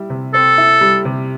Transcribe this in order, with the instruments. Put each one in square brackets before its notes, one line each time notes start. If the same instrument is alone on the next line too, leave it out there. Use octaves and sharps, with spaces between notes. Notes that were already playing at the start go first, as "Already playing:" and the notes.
Already playing: [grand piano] G3 E4
C3
[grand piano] C4 [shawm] A4
[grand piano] E4
G3
C3